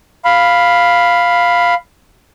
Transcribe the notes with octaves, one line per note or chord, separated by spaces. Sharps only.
F5 B5